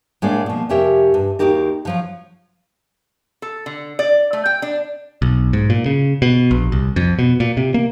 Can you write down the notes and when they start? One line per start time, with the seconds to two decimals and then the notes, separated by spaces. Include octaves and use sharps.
0.22 A2 G#3 A#3 D4
0.46 B2 F3
0.69 F2 C3 C#4 G4 A#4 E5
1.14 G2
1.39 D#2 A#3 D#4 F#4 G4 A#4
1.85 D3 F3 F#3
3.42 A4
3.66 D3
3.99 D5
4.33 A3
4.46 G5
4.62 D4
5.22 B1
5.53 G#2
5.70 A#2
5.86 C#3
6.22 B2
6.51 A#1
6.72 C2
6.96 F2
7.19 B2
7.40 A#2
7.57 C3
7.74 A#3